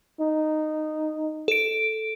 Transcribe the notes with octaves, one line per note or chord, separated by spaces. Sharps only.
D#4
A4 D7